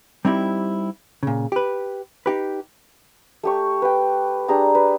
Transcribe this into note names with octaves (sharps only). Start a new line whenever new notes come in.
G3 C4 D#4 E4 G4
A#2 C#3
G4 B4
D#4 G4 B4
A3 G4 C#6
B4 G5
D4 G4 G#4 A#5
B4